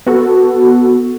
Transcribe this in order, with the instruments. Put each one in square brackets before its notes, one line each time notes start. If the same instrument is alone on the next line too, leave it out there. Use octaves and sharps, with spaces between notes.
[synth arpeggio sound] B3 F#4 A4